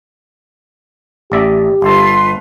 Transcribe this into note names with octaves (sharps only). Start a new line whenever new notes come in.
A1 G4 D5 E5
G1 F4 A4 B4 C6